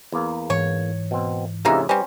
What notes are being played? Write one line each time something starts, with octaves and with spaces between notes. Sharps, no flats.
E2 A#3
G#2 E3 C#5
B2 C4
F2 A2 C#3 E3 A#3 D#4 G4 E5
G3 C4 C#4 B4